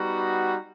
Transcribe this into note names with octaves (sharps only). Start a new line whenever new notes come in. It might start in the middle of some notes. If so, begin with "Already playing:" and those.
Already playing: G3 B3 D#4 F#4